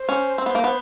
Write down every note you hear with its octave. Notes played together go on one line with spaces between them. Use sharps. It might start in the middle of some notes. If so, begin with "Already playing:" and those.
Already playing: C5
C#4
C4
B3
A#3
B3